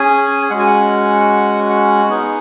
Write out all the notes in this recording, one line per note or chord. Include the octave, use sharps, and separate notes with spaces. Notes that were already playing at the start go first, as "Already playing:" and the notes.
Already playing: C#4 G#4 G#5
G#3 C#4 F#4 F#5
G#5
F#5
F#5
B3 D#4 G#4